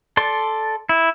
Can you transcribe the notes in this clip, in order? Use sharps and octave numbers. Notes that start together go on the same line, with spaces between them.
A4 D5 C6
E4